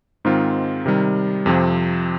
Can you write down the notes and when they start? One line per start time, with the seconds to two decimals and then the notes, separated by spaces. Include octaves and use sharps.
0.25 G#2 D#3 G#3 C4 F4
0.86 C3 D#3 G3
1.46 F2 C3 F3 C4